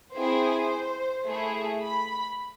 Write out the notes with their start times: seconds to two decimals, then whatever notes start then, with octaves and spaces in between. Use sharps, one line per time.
0.13 C4 E4 G#4 C5
1.26 A3 E4 G#4
1.82 B5